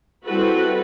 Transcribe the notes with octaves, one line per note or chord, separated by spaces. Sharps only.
G3 C4 E4 F#4 A4 B4